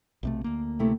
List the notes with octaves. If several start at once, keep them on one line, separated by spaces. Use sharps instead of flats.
B1 C3 A3
D2 A#3
C3 A3 E4